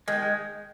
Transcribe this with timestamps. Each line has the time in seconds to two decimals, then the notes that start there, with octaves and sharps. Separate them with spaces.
0.08 D#3 G#3
0.22 G#3